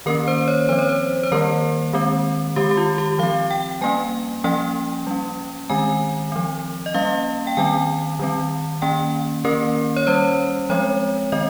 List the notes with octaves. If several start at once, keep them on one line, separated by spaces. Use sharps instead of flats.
D#3 A#3 C#4 A#4
C5
C#5
F3 C4 C5
C#5
C5
C5
D#3 G3 A#3 A#4
D#3 G#3 C4
D#3 G#3 C4 G4
G4
F4
G4
F3 C4 F5
G5
G3 A#3 C#4 G#5
F3 A#3 C#4 G5
G3 C#4
D#3 G#3 C4 G#5
F3 C4
D#5
G3 A#3 C#4 F5
G5
D#3 G3 C4 G#5
D#3 G3 C4
D#3 A#3 C#4 G5
D#3 A#3 C#4 A#4
C#5
G3 C#4 C5
F3 G#3 C4 C#5
D#3 G#3 C4 D#5